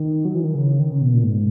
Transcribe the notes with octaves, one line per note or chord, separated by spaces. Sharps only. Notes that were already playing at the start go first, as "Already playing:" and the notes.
Already playing: D#3
F#3
E3
D#3
C#3
D#3
C#3
B2
A#2
G#2